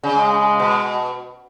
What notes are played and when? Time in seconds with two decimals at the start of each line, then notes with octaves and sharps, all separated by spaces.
0.03 C#3
0.17 G#3
0.59 B2